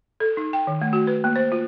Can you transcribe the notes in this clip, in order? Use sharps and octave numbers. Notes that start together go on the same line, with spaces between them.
A4
D#4
G5
D#3
A3
F#4
B4
A#3
C5
F4